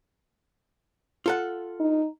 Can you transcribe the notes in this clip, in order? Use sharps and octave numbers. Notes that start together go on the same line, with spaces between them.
F4 A4 F#5
D#4